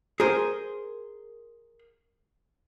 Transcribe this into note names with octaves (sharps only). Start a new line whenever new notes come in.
G#4 A#4 C5